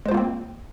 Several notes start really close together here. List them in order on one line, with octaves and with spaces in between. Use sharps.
G#3 C5 F4 A#3 C4